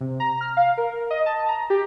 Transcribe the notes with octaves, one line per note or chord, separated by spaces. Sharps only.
C3
A#5
F6
F5
A#4
D#5
A5
A#5
G4